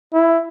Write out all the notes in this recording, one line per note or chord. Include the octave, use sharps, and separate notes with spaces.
E4